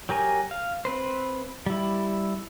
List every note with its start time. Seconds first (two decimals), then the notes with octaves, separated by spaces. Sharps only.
0.09 F#3 G4 A#4 G#5
0.51 F5
0.85 C4 B4 C5
1.66 G3 E4